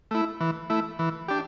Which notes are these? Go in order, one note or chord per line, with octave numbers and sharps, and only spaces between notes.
A3 E4
E3
A3 E4
E3
D4 G4